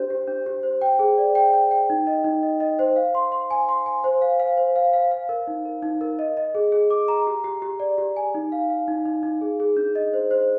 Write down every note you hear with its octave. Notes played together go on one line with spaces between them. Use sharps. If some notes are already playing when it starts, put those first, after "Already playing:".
Already playing: D4 G4 C5
G4
D4
G4
C5
G5
G#4
D5
G5
G5
G5
D#4
D#5
D#4
D#5
D#5
C5
F5
C6
C6
G#5
C6
G#5
C5
F5
F5
C5
F5
F5
F5
A#4
D#4
A#4
D#4
A#4
D#5
D#5
G#4
G#4
D6
A#5
G4
G4
G4
D5
G4
G#5
D#4
F5
F5
D#4
D#4
D#4
G#4
G#4
D4
D#5
C5
C5